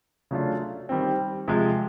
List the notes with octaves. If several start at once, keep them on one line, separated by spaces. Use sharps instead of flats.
C#3 F#3 A3 D4 F4
D#3 G3 C4
C3 F3 G#3